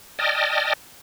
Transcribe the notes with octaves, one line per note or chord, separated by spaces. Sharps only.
D5 D#5 G5 A5 D#6 F6